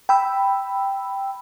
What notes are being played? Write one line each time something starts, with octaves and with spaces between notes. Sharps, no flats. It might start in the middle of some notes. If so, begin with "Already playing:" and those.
G5 B5 E6